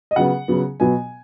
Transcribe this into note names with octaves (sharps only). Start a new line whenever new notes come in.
D#5
C#3 F#3 B3 F#5
C#3 F#3 B3
B2 F#3 B3 G#5